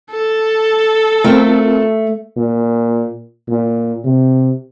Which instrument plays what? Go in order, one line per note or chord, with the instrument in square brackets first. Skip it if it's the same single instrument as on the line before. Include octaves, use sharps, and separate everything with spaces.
[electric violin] A4
[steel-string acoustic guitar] A3 [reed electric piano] C4 F4 A#4
[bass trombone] A#2
A#2
C3